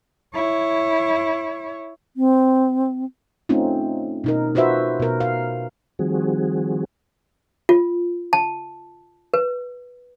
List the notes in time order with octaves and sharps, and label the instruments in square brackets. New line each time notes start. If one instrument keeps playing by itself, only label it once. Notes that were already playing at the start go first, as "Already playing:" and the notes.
[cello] E4 C#5
[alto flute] C4
[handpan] A3 C4 C#4 D#4 F4
B2 D#4 A#4
F4 F#4 B4 C5 E5
B2 A#4
F5
[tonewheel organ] D#3 F3 G3 C4 F#4 G#4
[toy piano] F4
A5
B4